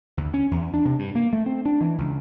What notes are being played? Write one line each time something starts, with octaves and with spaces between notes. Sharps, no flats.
D2
C#4
E2
D4
C3
G2
A#3
A3
C4
D4
E3
C#2